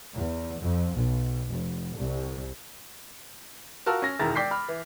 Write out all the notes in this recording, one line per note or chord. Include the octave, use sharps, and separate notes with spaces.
E2
F2
B1
F1
C2
F4 F#4 A#4 A5 E6 F6
C#4 A#6
E1 D#3 G#3 E4 A#5 A6
D5 G5 D6 G6 B6 C7
B5 F6
E3